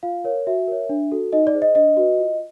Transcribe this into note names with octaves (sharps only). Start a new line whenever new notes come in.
F4 F5
A#4 C#5
F#4 E5
A#4 C#5
D4
F#4 A4
D#4 D#5
D5
G#4 C5
D#5
D4 D#5
F#4 B4
F4